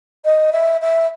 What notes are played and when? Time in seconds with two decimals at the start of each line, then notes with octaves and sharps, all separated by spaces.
0.25 D#5
0.52 E5
0.81 E5